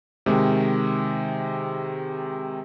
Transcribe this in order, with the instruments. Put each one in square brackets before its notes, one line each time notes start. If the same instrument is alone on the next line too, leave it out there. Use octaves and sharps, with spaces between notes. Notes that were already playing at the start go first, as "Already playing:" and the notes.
[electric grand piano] C3 D#3 G#3